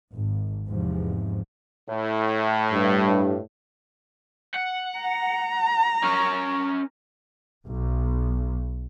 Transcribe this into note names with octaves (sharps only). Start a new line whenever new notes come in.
G#1
E2 G#2 C3 F3
A2
G2
F#5
A#5
C#4 A#4
B1